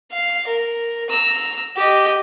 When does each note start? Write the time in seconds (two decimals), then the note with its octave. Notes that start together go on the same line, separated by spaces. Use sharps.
0.12 F5
0.47 A#4
1.10 A#5 E6
1.76 G4 D#5